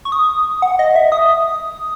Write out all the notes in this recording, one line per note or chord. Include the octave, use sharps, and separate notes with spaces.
C#6
D#6
F#5
D#5
E5
D#6